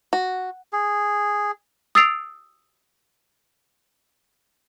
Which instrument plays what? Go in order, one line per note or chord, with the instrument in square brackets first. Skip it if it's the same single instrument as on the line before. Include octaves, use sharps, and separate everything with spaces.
[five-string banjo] F#4
[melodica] G#4
[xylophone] D#6 E6 A6 C7 D7 F7